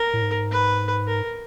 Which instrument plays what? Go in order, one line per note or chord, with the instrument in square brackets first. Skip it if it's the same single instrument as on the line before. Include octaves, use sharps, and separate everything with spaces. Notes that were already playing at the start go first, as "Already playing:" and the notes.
Already playing: [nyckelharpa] A#4
[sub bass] A2
G#2
[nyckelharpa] B4
A#4